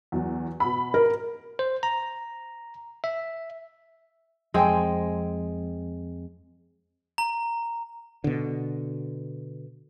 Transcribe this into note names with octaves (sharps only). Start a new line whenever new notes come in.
E2 F#3
B2 B5
A#4
C5
A#5
E5
F2 G#3 C4 C5 G5 G#5
A#5
B2 D3